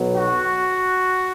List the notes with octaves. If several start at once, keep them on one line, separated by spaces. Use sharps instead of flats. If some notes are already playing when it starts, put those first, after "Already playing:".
Already playing: B1 B2 F#3 B3
F#4